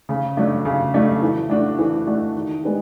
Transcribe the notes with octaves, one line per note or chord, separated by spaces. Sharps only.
C#3
F#3 A3 D4
C#3
F#3 A3 D4
E3
A3 D4 F#4
E3
A3 D4 F#4
D#3
G#3 B3 D4 G4